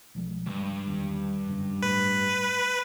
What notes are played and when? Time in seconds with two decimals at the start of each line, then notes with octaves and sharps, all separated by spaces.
0.15 B1 F3 G#3
0.46 C#2 G2 G#3
0.87 G1 E2 D#3
1.49 F#2 D3
1.83 A2 B4